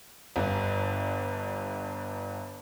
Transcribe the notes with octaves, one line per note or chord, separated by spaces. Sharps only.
G1 G2